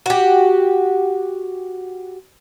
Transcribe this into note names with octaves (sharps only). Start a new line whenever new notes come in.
F#4 G4